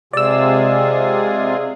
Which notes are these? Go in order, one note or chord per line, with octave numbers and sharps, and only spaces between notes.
C3 G#3 F4 G#4 D5 E6